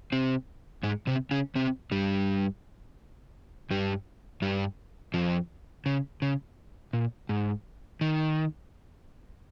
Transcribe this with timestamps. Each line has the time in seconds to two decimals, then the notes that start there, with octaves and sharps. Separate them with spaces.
0.12 C3 C4
0.83 G#2 G#3
1.07 C3 C4
1.31 C#3 C#4
1.55 C3 C4
1.91 G2 G3
3.71 G2 G3
4.42 G2 G3
5.14 F2 F3
5.86 C#3
6.22 C#3
6.93 A#2
7.29 G#2
8.01 D#3